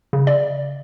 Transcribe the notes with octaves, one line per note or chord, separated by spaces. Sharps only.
C#3
D5